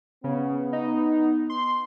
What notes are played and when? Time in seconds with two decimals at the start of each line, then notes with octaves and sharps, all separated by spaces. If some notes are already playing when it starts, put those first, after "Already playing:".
0.24 C#3 B3
0.73 D#4
1.49 C6